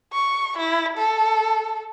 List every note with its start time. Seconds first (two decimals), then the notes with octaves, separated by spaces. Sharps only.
0.13 C#6
0.58 E4
0.98 A4